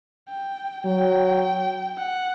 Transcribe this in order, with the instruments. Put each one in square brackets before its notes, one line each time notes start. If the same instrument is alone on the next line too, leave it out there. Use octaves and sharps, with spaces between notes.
[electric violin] G5
[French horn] F#3 [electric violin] G5
[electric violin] F#5